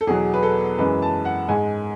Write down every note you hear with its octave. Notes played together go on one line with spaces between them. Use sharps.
A4
E2 B2 F#3 G#4
B4
A4
F#2 E3 G#3 B4
A5
F#5
G#2 G#3 G#5